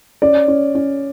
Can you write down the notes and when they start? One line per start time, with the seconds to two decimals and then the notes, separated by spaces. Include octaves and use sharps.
0.22 C#4 D5
0.48 C#4
0.75 C#4